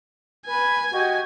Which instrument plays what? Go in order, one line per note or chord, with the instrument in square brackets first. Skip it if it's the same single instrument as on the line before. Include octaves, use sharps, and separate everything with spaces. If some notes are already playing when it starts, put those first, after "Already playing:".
[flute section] B4 [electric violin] G#5
[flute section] F#4 G4 D#5